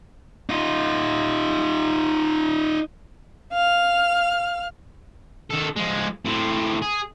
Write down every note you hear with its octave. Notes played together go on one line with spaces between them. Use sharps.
D#4 F4
F5 F6
D#3 A4
F3 G#3
A2 C4
G#4